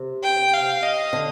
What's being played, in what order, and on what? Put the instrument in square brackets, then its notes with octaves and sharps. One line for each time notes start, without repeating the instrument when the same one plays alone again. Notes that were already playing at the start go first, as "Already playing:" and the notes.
Already playing: [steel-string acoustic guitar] C3
[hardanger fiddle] G5
F5
D#5
[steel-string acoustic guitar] D3